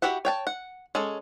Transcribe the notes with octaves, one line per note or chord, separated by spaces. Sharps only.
E4 F#4 G4 E5 F#5
C#5 G5 A5
F#5
G#3 C#4 A4